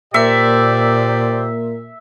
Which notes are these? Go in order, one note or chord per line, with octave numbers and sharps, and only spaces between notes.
A#2 A#3 G4 A#4 C5 D5 E5